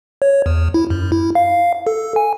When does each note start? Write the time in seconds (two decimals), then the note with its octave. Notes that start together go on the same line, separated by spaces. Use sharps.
0.22 C#5
0.46 E2
0.74 E4
0.90 F#2
1.12 E4
1.35 F5
1.87 A4
2.16 G#5